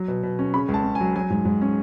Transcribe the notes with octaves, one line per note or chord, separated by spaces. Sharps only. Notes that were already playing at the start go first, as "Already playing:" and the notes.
Already playing: F#3
B2
B2
C#4
C#3 B5
C#2
A5
C#4
G#5
F#3
F#3 G#5
G#2
G#2
C#4